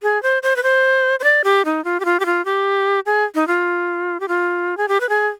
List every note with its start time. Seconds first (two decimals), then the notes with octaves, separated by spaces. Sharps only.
0.03 G#4
0.23 C5
0.43 C5
0.56 B4
0.63 C5
1.20 C5
1.24 D5
1.44 G4
1.65 D#4
1.84 F4
2.00 G4
2.05 F4
2.20 G4
2.26 F4
2.45 G4
3.06 G#4
3.35 D#4
3.48 F4
4.20 G4
4.28 F4
4.77 G#4
4.88 G4
5.00 B4
5.09 G#4